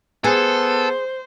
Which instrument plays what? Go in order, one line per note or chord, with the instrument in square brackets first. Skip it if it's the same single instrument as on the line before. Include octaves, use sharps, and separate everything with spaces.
[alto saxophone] B3 [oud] G#4 [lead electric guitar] A4 [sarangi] C5